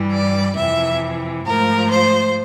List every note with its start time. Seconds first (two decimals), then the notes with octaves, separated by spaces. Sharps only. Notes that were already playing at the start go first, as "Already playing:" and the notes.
Already playing: G2 E3 G3
0.11 D5
0.55 F2 C3 E3 E5
1.45 G#2 F3 A3 A#4
1.90 C5